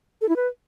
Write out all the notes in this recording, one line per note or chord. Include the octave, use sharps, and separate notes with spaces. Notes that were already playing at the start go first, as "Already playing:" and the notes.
A4
E4
B4